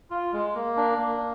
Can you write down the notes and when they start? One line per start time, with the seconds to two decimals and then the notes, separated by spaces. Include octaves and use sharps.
0.11 F4
0.33 G#3
0.54 A#3
0.77 D4
0.98 A#3